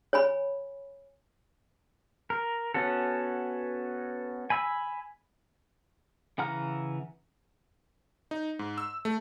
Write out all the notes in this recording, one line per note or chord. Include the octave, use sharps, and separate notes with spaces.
C#5 G#5 B5
A#4
B3 C#4 F#4 A4
G#5 B5 E6
C#3 E3 F#5 A#5 F6
D#4
G#2
E6
A3